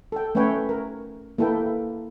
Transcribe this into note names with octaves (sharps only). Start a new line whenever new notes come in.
A4 G5
A3 C#4 B4 C#5 G5 G#5
A#4
A#3 E4 A4 B4 G5